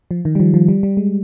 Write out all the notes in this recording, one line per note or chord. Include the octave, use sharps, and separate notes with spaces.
F3
D#3
G3
F3
F3
G3
G3
G#3